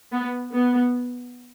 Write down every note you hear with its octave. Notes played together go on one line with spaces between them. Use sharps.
B3
B3